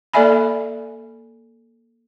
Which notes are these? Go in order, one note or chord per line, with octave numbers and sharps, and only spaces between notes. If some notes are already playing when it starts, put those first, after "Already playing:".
A#3 A4 D5 E5 G#5 B5